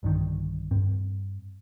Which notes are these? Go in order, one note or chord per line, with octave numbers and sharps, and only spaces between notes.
B1 G2 D3 D#3
G2 C4